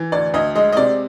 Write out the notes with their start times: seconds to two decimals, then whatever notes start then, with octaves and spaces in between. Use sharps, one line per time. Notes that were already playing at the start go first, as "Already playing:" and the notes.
Already playing: E3
0.12 D2 D5
0.34 D2 D#5
0.55 G#3 D#5
0.72 D#5
0.77 C3 D5